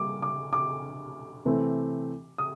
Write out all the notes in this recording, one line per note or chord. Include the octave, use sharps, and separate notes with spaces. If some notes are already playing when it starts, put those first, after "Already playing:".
Already playing: G3 A#3 D6
D6
D6
C3 E3 A3 C4
D#6